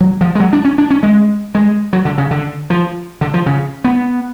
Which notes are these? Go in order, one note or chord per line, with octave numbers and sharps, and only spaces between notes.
F#3
F3
G#3
F#3
D4
C#4
D4
C#4
G#3
G#3
F#3
D3
C#3
D3
F3
D3
F3
C#3
B3